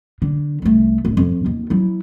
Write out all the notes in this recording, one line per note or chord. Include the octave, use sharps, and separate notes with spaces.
D3
C2 A3
D1
F2 F3
D#2
F#3 E4